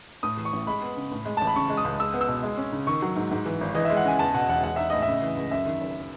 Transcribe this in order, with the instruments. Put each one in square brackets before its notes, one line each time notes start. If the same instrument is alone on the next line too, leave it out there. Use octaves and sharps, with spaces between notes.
[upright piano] A2 [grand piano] D#6
[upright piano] E3
[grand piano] C#6
[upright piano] A1
[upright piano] G#3 [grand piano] B5
[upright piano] B3
C#3
A2
G#3
[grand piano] A5
[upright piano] A1
[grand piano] B5
[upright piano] C#3 [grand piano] C#6
[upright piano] G#3
[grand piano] D#6
[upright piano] C#2
[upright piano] G#3 [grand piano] E6
[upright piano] B3
[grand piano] E6
[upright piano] B2
G#3
C#4
C#3
[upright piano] D#3 [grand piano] C#6
[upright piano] F#3
G#2
G#2
E3
G#1
[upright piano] E3 [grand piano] D#5
[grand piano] E5
[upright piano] G#3
[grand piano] F#5
[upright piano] C#3 [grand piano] G#5
[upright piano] E2 [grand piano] A5
[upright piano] B2 [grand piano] F#5
[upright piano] E1 [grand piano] F#5
[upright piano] G#3 [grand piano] F#5
[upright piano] D#4 [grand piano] E5
[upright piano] A2 [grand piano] D#5
[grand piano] E5
[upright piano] C#3
E3
C#2
[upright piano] F#2 [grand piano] E5
[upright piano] D#3
F#1